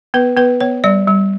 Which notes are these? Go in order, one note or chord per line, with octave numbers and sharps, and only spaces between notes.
B3 B4
B3 B4
B3 C#5
G3 D5
G3